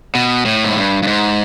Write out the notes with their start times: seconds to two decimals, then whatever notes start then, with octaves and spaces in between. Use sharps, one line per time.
0.15 B2
0.46 A2
0.64 G#2
0.76 G2
1.03 G2
1.07 G#2